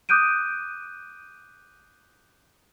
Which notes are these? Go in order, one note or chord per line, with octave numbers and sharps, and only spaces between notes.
D6 D#6 F#6 G6 D7 D#7